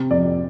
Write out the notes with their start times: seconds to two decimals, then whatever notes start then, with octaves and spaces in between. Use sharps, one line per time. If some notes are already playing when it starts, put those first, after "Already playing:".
Already playing: C3
0.11 F2 D5